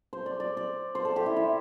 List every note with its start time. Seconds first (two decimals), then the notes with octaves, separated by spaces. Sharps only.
0.13 C5
0.26 D5
0.40 D5
0.57 D5
0.95 C5
1.05 A4
1.16 G4
1.26 E4
1.36 E4